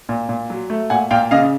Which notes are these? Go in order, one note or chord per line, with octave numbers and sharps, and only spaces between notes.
A#2
A#2
F#3
A3
A#2 F#5 G#5
A#2 F5 G5
C#3 D#5 F5